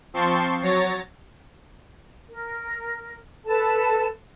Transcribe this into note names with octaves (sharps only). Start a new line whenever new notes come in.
F3 C4 A5 C6 C#6 C7
F#3 C#5 A6 A#6
A#4
A4 B4 A5